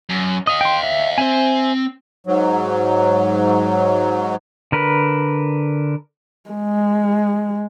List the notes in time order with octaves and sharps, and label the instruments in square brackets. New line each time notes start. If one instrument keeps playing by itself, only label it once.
[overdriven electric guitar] F#2
[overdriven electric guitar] D#5 F5 [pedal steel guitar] D#6
[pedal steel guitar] G5 C6
E5
[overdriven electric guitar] C4 [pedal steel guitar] C5 E5 G#5
[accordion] G#2 F#3
[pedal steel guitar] D3 A#4 B4
[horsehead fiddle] G#3